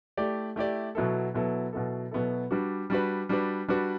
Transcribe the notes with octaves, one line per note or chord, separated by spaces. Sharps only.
A3 E4 G4 D5
A3 E4 G4 D5
B2 F#3 B3 E4 A4
B2 F#3 B3 E4 A4
B2 F#3 B3 E4 A4
B2 F#3 B3 E4 A4
G3 D4 F#4 B4
G3 D4 F#4 B4
G3 D4 F#4 B4
G3 D4 F#4 B4